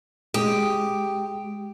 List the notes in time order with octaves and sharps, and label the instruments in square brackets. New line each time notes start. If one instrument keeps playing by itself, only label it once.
[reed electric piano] G#3 D#6 [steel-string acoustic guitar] G4